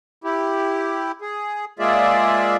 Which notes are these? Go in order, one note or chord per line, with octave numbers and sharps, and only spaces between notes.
E4 G4
G#4
G#3 A#3 F4 G#4 D5 E5